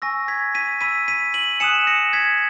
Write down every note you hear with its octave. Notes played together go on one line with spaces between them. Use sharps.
G#5 C#6 E6 A#6
G#6 B6
B6 D#7
B5 E6 B6 D#7
B6 D#7
D#7 F#7
G#5 D#6 F#6 C#7 E7
A#6 C#7
G#6 B6